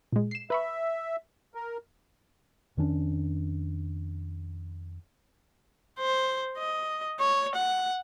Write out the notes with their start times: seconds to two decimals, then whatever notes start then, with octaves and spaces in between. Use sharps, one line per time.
0.12 A#2 G#3
0.31 C7 E7
0.50 B4 E5 B5 C#6
1.55 A#4
2.77 F2 D#3 C#4 D4
5.99 C5
6.58 D#5
7.20 C#5
7.55 F#5